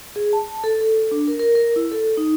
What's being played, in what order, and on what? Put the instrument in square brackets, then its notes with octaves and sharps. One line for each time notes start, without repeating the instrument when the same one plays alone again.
[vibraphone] G#4
A5
A4
A4
D4
A#4
A#4
A#4
E4
A4
D#4